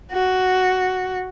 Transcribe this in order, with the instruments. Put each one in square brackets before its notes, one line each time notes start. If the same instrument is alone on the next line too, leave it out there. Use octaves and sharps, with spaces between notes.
[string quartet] F#4